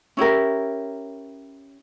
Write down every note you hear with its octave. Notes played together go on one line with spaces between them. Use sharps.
C#4 E4 G4 A#4